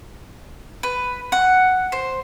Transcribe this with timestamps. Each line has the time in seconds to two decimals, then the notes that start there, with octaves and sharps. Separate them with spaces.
0.83 B4
1.32 F#5
1.92 C5